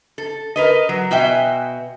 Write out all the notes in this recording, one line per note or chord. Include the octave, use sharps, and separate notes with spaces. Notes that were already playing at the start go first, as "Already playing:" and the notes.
A4
A#4 B4 D#5
F#3
B2 F#4 E5 G5 G#5